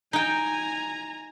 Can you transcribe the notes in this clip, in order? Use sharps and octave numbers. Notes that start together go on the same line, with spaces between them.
D#4 G5 G#5 A#5